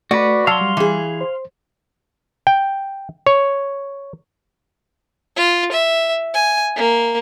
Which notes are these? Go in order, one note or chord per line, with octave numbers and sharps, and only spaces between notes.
A3 F#4 B4 D5
F#3 F5 A5 C6 E6 F6
G3
E3 G#4
C5
G5
C#5
F4
E5
G#5
A#3